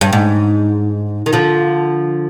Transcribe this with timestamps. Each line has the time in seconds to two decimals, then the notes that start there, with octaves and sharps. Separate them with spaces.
0.01 G2
0.13 G#2
1.26 D#3
1.33 D3 F3